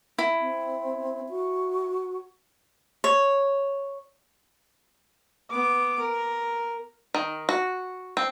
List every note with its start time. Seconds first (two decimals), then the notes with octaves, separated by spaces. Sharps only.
0.19 E4
0.41 C4
1.29 F#4
3.04 C#5
5.50 B3 D6
5.99 A#4
7.14 D#3
7.49 F#4
8.17 C4